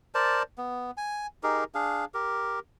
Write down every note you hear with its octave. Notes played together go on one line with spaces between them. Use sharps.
A#4 C5 D5 A5
B3
G#5
D#4 G4 G#4 A#4
D4 G#4 F5
G4 A#4